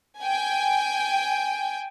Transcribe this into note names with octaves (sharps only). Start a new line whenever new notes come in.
G5 G#5